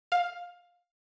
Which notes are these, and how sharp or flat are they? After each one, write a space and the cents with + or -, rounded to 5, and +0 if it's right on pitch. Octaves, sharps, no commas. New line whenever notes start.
F5 +15